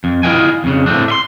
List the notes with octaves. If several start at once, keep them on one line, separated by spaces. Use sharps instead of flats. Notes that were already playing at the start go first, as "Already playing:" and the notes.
F2
E4 F4 G#4 D#5 G5 G#5
F2 C#3
A2 A3 C4 D4
E5 C6